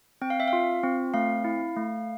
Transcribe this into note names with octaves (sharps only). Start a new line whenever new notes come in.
C4 G5
F5
E5
F5
F4
C4
A3 F5
E4
A3